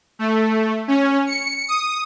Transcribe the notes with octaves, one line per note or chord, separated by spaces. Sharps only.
A3
C#4
C#7
D#6